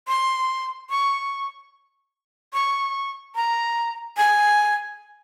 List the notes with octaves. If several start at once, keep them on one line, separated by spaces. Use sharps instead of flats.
C6
C#6
C#6
A#5
G#5